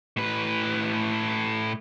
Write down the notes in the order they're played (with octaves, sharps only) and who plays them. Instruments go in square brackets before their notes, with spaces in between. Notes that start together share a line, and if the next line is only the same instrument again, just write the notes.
[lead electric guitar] A2 B4